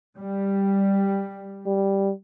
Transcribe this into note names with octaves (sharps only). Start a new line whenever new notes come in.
G3
G3